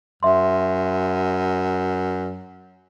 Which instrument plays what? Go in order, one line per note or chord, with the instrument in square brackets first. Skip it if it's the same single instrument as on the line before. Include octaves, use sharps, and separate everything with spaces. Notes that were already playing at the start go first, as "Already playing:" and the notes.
[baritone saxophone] F#2 [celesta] E5 C6